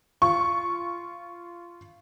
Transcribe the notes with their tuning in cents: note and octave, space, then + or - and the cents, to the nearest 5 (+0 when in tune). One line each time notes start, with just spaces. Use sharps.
F4 -15 C#6 +0